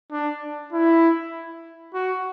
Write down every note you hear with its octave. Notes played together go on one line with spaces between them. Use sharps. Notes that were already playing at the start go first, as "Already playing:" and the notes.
D4
E4
F#4